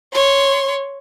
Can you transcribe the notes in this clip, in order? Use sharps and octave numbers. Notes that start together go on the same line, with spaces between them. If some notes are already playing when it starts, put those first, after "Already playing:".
C#5 C6